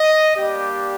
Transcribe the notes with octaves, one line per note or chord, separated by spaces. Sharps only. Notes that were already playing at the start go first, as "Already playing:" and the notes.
Already playing: D#5
G3 A#3 D4 G4